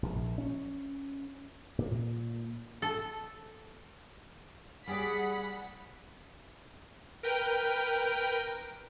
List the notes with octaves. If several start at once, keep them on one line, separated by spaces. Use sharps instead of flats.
A#1
C#4
A#2
A4
G3 G#4 D5 F#5 B5 B6
A#4 B4 G5